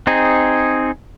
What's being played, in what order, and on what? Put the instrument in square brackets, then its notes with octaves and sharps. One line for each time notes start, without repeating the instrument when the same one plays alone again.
[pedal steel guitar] C4 D#4 G#4